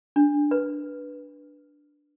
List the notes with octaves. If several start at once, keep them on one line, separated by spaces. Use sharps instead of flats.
D4
B4